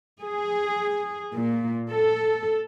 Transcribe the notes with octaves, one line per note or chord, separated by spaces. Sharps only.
G#4
A#2
A4